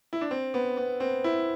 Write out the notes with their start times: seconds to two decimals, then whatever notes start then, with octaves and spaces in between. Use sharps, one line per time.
0.13 E4
0.21 D4
0.31 C4
0.54 B3
0.77 B3
1.00 C4
1.24 E4